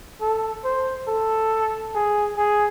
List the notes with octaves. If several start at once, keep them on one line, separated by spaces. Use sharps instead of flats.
A4
C5
A4
G#4
G#4